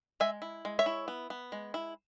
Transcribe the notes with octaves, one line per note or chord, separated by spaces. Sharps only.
G#3 E5 G#5
E4
G#3
C#5 E5
E4
B3
B3
G#3
E4